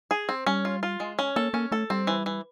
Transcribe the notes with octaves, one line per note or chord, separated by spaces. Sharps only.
G#4
C4
G3 C#4
F4
F4
G#3
C#4
A#3 A4
A#3 C#4
A3 A4
G3 C4
E3
E3